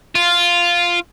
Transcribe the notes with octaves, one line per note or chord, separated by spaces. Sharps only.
F4